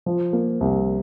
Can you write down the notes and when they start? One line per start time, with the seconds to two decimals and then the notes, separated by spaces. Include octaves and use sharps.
0.06 F3
0.33 A#3
0.61 C2